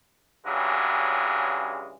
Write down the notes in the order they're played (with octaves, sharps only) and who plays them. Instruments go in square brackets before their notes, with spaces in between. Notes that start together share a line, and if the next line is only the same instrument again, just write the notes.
[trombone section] G2 C#3 E3 F#3 G#3